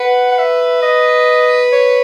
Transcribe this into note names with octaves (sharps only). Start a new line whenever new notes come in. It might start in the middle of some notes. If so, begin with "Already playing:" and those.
Already playing: B4 F#5
F#5
E5
D#5
C#5